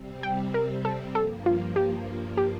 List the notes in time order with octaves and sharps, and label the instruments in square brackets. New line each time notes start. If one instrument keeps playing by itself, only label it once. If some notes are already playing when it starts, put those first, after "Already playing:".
Already playing: [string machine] C3 G3 C4
[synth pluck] G5
A#4
A4
[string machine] G2 F3 A#3 [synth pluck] A4
[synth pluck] F4
G4
G4